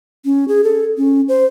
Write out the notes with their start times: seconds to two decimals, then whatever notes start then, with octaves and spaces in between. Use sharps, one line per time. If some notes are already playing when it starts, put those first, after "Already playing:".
0.25 C#4
0.48 G#4
0.64 A4
0.97 C#4
1.28 C5